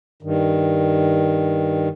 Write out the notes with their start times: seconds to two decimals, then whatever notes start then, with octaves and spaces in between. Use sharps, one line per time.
0.23 G2 D#3